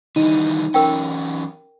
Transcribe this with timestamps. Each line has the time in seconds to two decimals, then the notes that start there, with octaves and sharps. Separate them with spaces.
0.16 D#3 E3 G3 D#4
0.74 E3 F#3 C#4 A#4 G5